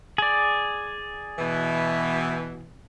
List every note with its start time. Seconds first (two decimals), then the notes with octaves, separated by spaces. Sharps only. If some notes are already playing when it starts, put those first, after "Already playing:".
0.18 G#4 D5
1.39 B2 E3